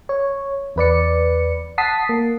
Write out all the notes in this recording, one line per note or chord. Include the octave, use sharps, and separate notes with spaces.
C#5
E2 B4 D5 C#7
F#5 A5 D#6 B6 C7
A#3